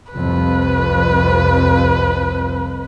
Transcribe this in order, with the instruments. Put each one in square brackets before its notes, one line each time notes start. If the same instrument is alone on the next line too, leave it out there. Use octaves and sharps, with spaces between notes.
[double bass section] C2 F2 [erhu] B4